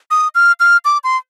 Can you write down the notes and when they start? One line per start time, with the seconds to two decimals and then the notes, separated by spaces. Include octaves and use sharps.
0.11 D#6
0.35 F6
0.60 F6
0.85 D6
1.04 C6